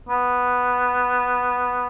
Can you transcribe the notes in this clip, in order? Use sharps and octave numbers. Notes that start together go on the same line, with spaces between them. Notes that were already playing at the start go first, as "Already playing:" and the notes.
B3